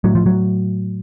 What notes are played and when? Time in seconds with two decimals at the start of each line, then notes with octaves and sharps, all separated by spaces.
0.04 A2 F#3
0.15 F3
0.26 F#3